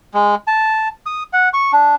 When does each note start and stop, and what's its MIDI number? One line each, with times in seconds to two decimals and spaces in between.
0.14 0.35 56
0.47 0.88 81
1.06 1.23 87
1.33 1.49 78
1.54 1.71 85
1.73 1.95 62